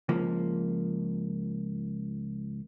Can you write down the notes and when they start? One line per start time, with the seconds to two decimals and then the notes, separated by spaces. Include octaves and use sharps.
0.09 C#2 F3 A#3